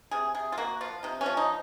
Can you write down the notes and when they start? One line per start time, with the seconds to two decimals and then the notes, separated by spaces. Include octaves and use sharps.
0.11 C3 G#4
0.34 C3 G#4
0.52 F4
0.58 A#3 F#4
0.81 F3 F4
1.03 C3 D#4
1.21 C#4
1.26 F3
1.37 D#4